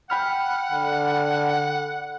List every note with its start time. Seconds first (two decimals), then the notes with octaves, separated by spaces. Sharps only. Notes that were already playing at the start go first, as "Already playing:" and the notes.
0.10 F#5 G5 B5 F6
0.71 D3